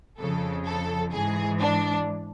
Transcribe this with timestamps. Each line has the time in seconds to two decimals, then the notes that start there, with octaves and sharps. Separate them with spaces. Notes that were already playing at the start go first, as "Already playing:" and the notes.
0.19 F2 C#3 F3 A4
0.66 A4
1.12 G#2 E3 G#4
1.60 D4